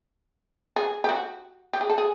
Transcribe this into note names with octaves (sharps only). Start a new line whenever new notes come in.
G#4
G4
F#4
G4
G#4
A4
G#4